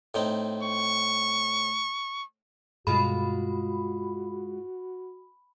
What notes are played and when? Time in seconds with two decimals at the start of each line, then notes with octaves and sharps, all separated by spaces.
0.14 A2 C4 D#4
0.63 C#6
2.87 G2 B2 G3 G#3 F4 F#4 G#4 B5